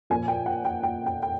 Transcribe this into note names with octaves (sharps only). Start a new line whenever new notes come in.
A#2 F3 A#3 G#5
G5
F#5
G5
G5
G5
G5